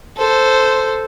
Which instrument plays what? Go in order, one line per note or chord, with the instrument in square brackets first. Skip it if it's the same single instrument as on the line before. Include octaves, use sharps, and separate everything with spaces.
[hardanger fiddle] A4 C5